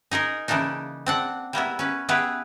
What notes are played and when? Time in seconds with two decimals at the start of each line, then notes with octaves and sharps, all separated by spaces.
0.11 D#4 G#4 A#4 D#5
0.48 C#3 E3 A#3 D4 D#4
1.06 C4 D4 F#5
1.53 G3 A#3 B3 E4
1.79 C#4 B4
2.09 B3 E4 G4 G#4 B4